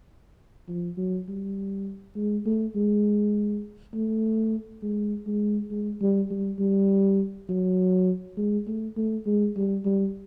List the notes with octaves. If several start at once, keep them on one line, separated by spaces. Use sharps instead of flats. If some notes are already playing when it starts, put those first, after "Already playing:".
F3
F#3
G3
G#3
A3
G#3
A3
G#3
G#3
G#3
G3
G3
G3
F#3
G#3
A3
A3
G#3
G3
G3